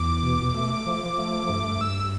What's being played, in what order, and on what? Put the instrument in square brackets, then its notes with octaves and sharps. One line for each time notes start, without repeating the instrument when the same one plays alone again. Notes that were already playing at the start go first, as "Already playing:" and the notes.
Already playing: [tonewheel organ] E2 [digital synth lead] D6
[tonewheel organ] B2
A3
F3
A3
G2
[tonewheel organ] G2 [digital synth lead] E6